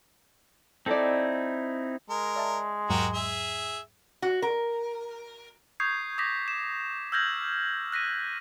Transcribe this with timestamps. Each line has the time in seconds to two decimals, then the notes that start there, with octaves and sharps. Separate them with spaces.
0.86 C4 D#4 E4 A4 D5
2.10 G#3 A#4
2.36 D5 E5 A5
2.90 E2 G#2 F#3 F#4 G4 A#4
3.14 G#4 E5
4.22 F#4
4.42 A#4
5.80 C#6 D#6 G6 G#6 C7
6.18 D6 D#6 G#6 A#6 B6
6.48 E7
7.12 E6 F6 G6 G#6 A#6 F#7
7.92 F#6 A#6 B6 D#7